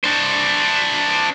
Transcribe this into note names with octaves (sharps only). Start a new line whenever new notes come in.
D4 C5